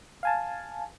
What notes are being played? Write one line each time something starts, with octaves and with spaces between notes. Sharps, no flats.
F5 G#5 A5